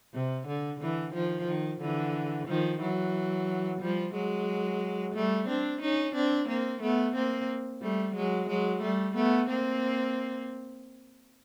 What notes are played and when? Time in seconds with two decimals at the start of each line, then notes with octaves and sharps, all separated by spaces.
0.14 C3
0.47 D3
0.80 D3 E3
1.14 D#3 F3
1.47 D#3
1.81 D3 E3
2.48 D#3 F3
2.81 E3 F#3
3.81 F3 G3
4.14 F#3 G#3
5.15 G3 A3
5.48 C4 D4
5.82 C#4 D#4
6.15 C4 D4
6.49 A#3 C4
6.82 A3 B3
7.15 A#3 C4
7.82 G3 A3
8.16 F#3 G#3
8.49 F#3 G#3
8.82 G3 A3
9.16 A3 B3
9.49 A#3 C4